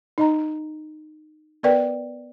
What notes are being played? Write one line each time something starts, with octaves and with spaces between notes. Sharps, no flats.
D#4 D#5 A#5
B3 A#4 B4 D5 G5